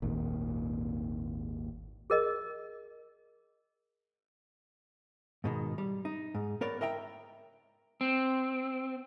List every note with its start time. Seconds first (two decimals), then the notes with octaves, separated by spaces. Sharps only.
0.02 G#1 D#2 A#2
2.10 G#4 A#4 D#5
5.44 G#2 B2 D#3
5.78 G3
6.05 D#4
6.35 G#2
6.61 B3 A#4 C#5 D5
6.81 A#4 D#5 E5 G5 A#5
8.01 C4